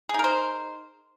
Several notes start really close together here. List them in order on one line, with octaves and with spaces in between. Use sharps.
G#4 D#4 A#4 C5